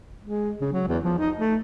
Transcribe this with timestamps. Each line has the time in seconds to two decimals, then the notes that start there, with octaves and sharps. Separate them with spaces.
0.24 G#3
0.61 C#3
0.72 F#3
0.88 E2
1.04 F3
1.18 D#4
1.37 A3